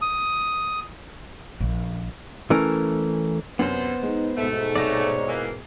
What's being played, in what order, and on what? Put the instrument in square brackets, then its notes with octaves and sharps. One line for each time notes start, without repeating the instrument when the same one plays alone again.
[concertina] D#6
[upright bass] A#1
[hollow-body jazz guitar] E3 A3 C#4 A#4
[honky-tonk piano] F#2 C3 [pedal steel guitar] B3 C5
[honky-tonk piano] G#3 [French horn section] D#4
[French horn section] G#2 B2 [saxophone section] A3 [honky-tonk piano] E5
[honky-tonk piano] C2 A#6 [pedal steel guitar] C#5 D5
[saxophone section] E3 A#3 [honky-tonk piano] G#4